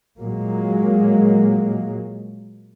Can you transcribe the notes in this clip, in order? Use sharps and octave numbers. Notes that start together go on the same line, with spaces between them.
A#2 F#3 G#3 A#3